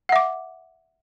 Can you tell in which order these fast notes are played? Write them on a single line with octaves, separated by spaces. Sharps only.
F#5 E5 D6